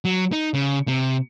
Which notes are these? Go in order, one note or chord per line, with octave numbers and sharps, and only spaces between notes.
F#3
D#4
C#3
C3